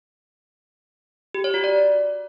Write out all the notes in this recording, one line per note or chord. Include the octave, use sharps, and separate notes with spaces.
G4
C#5
F#4
D5